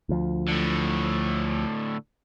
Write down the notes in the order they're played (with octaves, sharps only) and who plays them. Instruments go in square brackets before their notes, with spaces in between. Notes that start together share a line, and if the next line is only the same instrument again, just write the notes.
[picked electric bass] D2 F3
[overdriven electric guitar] A2 D3